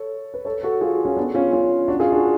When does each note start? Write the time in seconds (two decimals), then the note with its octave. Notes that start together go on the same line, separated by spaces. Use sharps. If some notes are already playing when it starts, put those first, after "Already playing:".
Already playing: A4 C#5
0.34 B4
0.45 A4 C#5
0.63 F#4 A4
0.81 F4 G#4
1.05 C#4 F4
1.16 B3 D4
1.34 C#4 F4
1.52 C#4 F4
1.88 D4 F#4
2.00 F4 G#4
2.12 D4 F#4